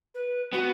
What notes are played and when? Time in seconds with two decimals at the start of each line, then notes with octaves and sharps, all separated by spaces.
0.15 B4
0.53 B3 F#4